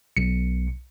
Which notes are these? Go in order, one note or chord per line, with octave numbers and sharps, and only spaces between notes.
B1 C#7